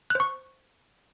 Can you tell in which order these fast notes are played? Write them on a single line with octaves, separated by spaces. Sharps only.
F#6 C5 C#6